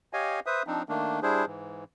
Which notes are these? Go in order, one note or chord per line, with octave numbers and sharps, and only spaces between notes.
G4 C#5 D#5 F5 G#5
B4 C5 E5 D#6
F3 C4 D4 D#4
D#3 A3 A#3 D4
G3 D4 E4 G#4 C5
G#2 E3